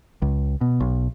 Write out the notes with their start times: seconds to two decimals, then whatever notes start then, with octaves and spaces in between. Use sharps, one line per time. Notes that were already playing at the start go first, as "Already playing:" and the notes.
0.22 C#2
0.61 B2
0.80 B1